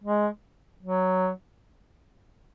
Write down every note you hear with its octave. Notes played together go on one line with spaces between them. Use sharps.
G#3
F#3